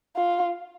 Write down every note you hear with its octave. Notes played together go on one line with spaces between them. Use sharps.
F4